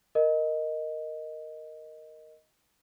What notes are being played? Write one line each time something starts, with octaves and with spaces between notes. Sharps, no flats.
A#4 D#5